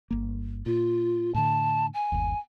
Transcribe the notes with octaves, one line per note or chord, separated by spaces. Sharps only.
G1 A#3
A#2 F4
A2 D3 A5
G#5
G1 D#2